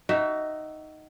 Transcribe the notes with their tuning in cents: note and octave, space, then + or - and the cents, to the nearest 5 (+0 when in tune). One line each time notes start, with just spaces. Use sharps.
D#4 +0 F#4 +30 E5 +0